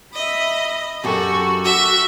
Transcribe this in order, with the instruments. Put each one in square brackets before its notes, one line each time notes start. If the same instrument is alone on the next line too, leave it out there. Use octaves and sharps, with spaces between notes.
[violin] D#5 [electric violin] E5 B5
[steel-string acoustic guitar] F#2 G4 [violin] F#4 [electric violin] A4 C#6
[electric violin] F#4 [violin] E5